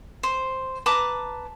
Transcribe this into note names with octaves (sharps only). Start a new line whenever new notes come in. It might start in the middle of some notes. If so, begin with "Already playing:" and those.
C5
B4 A5 A#5 D6